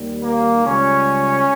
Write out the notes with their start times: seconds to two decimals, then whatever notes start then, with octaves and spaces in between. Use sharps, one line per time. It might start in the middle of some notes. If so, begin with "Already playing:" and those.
Already playing: D#2 D#3 G3
0.23 A#3
0.63 C#2 C#3 G3 C#4